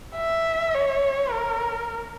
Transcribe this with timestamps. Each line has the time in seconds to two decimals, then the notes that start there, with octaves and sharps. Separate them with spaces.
0.17 E5
0.75 C#5
1.32 A#4